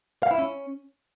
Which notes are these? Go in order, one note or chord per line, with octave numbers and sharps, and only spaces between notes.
F5
E4
C#4